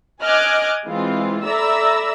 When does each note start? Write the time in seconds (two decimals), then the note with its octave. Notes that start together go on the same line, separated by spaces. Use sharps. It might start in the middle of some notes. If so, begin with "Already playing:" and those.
0.23 D#5 G#5 D6 F6 F#6 G#6
0.87 E3 G#3 C4 F4
1.44 A4 D5 E5 A#5 B5 E6